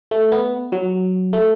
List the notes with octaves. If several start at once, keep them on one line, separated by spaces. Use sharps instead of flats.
A3
B3
F#3
A3